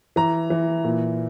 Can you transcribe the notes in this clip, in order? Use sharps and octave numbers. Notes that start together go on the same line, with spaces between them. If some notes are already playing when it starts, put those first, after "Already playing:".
E3 A#5
E3
A#2